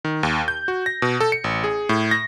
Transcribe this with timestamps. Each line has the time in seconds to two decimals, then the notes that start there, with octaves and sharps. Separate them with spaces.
0.05 D#3
0.23 D#2
0.48 G6
0.68 F#4
0.86 A#6
1.02 B2
1.21 A4
1.32 C#7
1.44 A1
1.64 G#4
1.89 A2
2.11 A#6